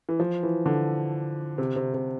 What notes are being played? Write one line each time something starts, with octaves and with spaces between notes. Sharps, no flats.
E3
F3
E3
D3
C3
C3
C3